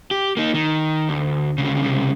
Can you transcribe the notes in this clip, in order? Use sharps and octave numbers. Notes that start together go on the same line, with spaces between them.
G4
A#3 D#4
D#3
D2
D2 C#3
C2 C#3